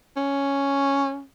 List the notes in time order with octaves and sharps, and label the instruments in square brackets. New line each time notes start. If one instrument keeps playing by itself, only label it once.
[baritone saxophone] C#4